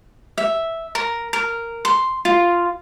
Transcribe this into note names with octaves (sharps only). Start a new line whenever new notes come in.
E5
A#4
A#4
C6
F4